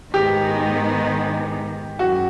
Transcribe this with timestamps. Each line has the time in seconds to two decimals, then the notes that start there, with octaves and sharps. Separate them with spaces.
0.14 G#2 D#3 G#3 B3 D#4 G4
1.99 F#2 F#4